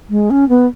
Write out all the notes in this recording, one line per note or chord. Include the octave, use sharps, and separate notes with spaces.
G#3
C#4
B3